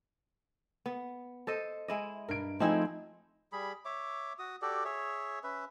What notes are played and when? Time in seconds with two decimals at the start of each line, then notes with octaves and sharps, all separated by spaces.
0.86 B3
1.47 A4 C5 D#5
1.88 G#3 E4 D#5
2.28 G2 A#4 D7
2.60 F3 A3 C4 D#4 E4 G#4
3.52 G3 G#4 B5
3.85 C#5 E5 D6
4.39 F#4 D#6
4.62 F#4 G4 A4 D5
4.84 G#4 C#5 E5
5.44 C#4 B4 E5